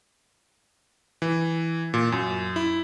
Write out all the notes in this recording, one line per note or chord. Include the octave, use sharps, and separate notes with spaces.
E3
A#2
F#2
E4